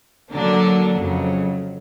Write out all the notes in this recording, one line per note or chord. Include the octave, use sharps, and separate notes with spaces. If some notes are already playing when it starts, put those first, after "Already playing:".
D3 F#3 A#3 D4
F2 C#3 F#3